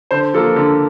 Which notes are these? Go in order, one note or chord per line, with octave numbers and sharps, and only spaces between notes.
D3 C5
F3 A#3 A4
D3